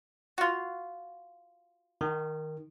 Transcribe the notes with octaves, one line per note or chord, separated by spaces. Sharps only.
F4 F#4
D#3